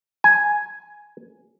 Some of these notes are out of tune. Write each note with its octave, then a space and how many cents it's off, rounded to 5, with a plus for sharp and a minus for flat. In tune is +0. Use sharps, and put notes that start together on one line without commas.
G#5 +5